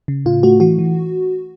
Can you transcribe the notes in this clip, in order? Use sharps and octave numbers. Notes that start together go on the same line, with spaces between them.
C#3
A2 F4
A3 F#4
E3 F#4
E3